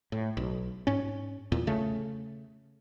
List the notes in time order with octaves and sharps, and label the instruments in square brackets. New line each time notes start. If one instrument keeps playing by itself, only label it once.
[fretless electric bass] A2
B1
G#2 C#4
E2 A#2
C#3 A3